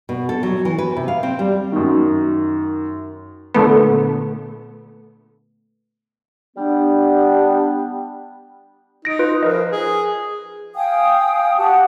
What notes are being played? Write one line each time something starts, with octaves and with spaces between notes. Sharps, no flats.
B2
A4
F#3
E3
B4
C3
F5
C4
G3
F#2 D#3
A#2 D3 A3 B3
G3 B3 D4
D#4 A#6 D7
F4 B4
F3 A#4 B4 D#5
G#4
F5 G5 G#5 D#6
F#4 G4 F#5 A5